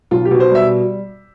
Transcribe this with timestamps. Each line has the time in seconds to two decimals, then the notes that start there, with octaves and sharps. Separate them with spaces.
0.11 B1 F4
0.25 G4
0.31 B2
0.40 C5
0.50 G3
0.55 E5